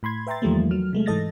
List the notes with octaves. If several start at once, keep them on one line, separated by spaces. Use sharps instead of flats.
A2 B5 C6 G#6
B4 E5 G5 A#5 C6 A6
E2 D#3 F3 G3 A3 A#3
F#3 F6
C3 G#3 A3
G#2 E3 A4 D#5 A6 A#6